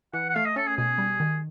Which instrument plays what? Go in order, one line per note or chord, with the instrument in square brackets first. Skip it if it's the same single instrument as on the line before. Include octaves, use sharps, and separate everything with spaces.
[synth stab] E3 [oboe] F#5
[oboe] F#5
[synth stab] A3 [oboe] F5
[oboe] D#5
[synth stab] C#4 [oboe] A4
[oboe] G#4
[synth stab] B2 [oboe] G#4
[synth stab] G3
D#3